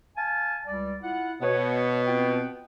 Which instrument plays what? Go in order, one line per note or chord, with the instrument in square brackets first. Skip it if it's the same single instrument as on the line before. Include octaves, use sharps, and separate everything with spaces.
[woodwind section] F5 G#5 A5
C#2 G3 D5
E4 F4 F#5
[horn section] B2 B3 [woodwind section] C#5
[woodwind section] C4 F4 G5